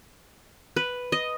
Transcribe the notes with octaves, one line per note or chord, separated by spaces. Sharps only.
B4
D#5